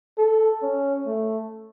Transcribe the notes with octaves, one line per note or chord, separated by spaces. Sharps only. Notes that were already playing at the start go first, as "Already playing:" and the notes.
A4
C#4
A3